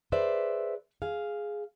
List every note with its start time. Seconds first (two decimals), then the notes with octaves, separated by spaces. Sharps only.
0.12 G#4 B4 C5 D5 E5
1.02 G#4 F5